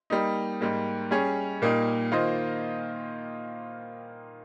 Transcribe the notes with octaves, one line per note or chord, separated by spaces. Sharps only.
G3 A#3 D#4
G#2 G3 A#3
G3 C#4 G#4 C#5
A#2 G3 A#3 D#4
D#3 A#3 F4 C5 D#5